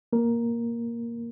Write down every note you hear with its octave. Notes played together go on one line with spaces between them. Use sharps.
A#3 A#4